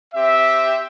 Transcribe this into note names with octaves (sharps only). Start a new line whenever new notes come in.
C4 G4 E5